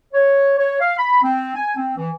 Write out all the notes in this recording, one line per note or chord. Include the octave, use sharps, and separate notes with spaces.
C#5
C#5
F5
B5
C4
G#5
C4
E3